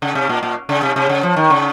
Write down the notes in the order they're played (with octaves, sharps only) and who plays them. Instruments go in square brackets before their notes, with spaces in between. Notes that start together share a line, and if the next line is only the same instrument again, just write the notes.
[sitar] C#3
C3
A#2
A#2
C#3
C3
C3
C#3
F3
D#3
C#3